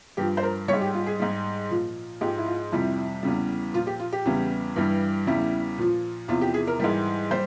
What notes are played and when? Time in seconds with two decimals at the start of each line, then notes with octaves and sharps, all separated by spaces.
0.17 G2 F3 G4
0.37 C5
0.43 A#4
0.68 G3 C#5
0.73 G#2
0.81 G4
0.94 F4
1.07 G#4
1.19 G#2 G3
1.70 A#2 F3
2.21 G#2 F3 G4
2.38 E4
2.46 F4
2.72 F2 C3 G3 E4
3.23 E2 C#3 G3
3.74 A#2 F4
3.77 F3
3.87 G4
4.00 F4
4.12 G4
4.25 E2 C#3 E3 G3
4.76 G2 E3 G3
5.27 E2 C#3 G3 E4
5.78 A#2 F3
6.28 E2 C3 F3 F4
6.41 G4
6.54 G#4
6.67 A#4
6.80 G#2 E3 G3
7.31 G3 C5